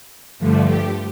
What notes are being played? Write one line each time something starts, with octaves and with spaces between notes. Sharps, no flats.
G2 D3 F3 A3
G4